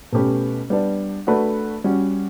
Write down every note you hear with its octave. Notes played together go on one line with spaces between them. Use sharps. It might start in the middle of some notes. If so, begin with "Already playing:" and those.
B2 A3 C#4 G4 B4
G3 B3 D4
A3 D4 F#4 B4
G3 C#4 F#4